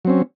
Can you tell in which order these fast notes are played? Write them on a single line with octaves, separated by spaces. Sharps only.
F#3 C4 C#4